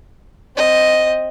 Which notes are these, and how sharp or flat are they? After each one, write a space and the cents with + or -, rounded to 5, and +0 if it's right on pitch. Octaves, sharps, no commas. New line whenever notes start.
C4 +0 D#5 +0